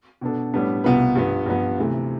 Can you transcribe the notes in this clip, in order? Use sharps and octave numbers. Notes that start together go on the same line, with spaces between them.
B2 B3 D4 A4
A2 G3 B3 D4
C2 B2 B3 F4 B4
G2 F3 B3
G2 F3 B3
D2 C3 E3 A3